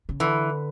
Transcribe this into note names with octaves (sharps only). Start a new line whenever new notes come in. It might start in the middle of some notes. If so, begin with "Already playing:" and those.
C#3
D3 E3